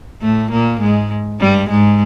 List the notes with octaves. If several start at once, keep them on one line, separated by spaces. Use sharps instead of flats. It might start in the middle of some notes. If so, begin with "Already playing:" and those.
A2 A3
A#2 A#3
G#2 G#3
G2 G3
G#2 G#3